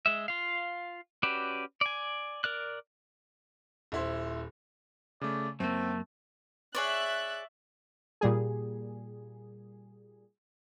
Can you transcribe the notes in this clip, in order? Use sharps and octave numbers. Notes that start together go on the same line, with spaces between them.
G#3 E5
F4 F5
C#4 F#4 G4 B4 D5
D5 G#5
A#4 D5 F#6
D#1 E4 C5
C#3 A3 D5
F#2 A3 A#3 C4
G#4 C#5 D5 E5 F#6
A#2 G3 G#4